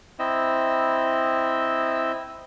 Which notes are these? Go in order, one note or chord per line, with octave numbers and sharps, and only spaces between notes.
C4 E4 D#5 E6